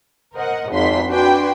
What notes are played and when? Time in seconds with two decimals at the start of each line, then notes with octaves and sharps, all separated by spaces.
0.35 A#4 C5 D#5 F#5
0.71 G#1 F2 F#4 C6 B6
1.09 D4 F#4 B4 G5 G#5 C6